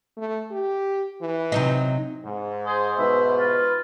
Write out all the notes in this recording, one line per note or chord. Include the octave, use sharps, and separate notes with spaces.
A3
G4
E3
C3 F#3 D#4
G#2
G#4 C5
G#2 B2 B4 E5
F4